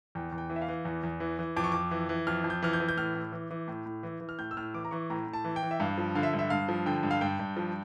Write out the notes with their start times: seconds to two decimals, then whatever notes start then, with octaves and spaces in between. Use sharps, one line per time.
0.15 E2 G5
0.32 E2
0.38 G5
0.50 E3
0.56 E5
0.62 F5
0.69 E3
0.85 E2
1.03 E2
1.20 E3
1.39 E3
1.56 F2 D6
1.64 C#6
1.72 F2 D6
1.91 E3
2.09 E3
2.27 F2 F6
2.44 F2
2.50 G6
2.63 E3 F6
2.73 G6
2.80 E3
2.89 G6
2.97 A2 F6
3.15 A2
3.32 E3
3.51 E3
3.68 A2
3.86 A2
4.03 E3
4.21 E3
4.29 F6
4.39 A2 G6
4.51 E6
4.57 A2 F6
4.74 E3 D6
4.85 A#5
4.91 E3 C#6
5.10 A2 A#5
5.27 A2
5.33 A5
5.44 E3
5.56 G5
5.63 E3
5.71 E5
5.80 G2 F5
5.98 F3
6.15 D3 F5
6.23 E5
6.33 G2
6.39 E5
6.50 G2 F5
6.69 F3
6.86 D3 G5
7.03 G2
7.11 F5
7.21 G2 G5
7.39 G2
7.57 F3